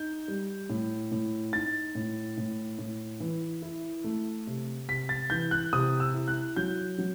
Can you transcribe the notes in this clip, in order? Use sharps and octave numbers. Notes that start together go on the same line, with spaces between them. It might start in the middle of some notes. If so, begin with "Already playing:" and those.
Already playing: D#4 G6
G3
A2
A2
D#4 A6
A2
A2
A2
E3
E4
A3
C3
C3 B6
A6
E3 G6
F#6
C3 D#6
E6
E4
F#6
F#3 G6
F#3